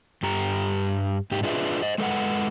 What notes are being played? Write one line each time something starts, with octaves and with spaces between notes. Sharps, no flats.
G2 G4 A#5
G#2 D#4 G4
D4 F4 G#4 B4 D#5 E5
C5 D#5
G#3 A4 B4 D#5 F#5